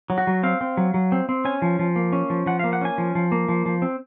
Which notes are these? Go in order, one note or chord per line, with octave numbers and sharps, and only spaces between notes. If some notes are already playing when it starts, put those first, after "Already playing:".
F#3
F#4
F#3
C4 F5
C4
F#3
F#3
C4
C4
C#4 G#5
F3
F3
A#3
C#4
F3
F3 F#5
A#3 F5
F#5
C#4 G#5
F3
F3
A#3
F3
F3
C4